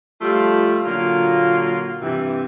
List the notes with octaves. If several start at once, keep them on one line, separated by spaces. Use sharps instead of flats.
F3 G3 A3 F4
A#2 D3 F#3 A#3 F4
G2 C3 E3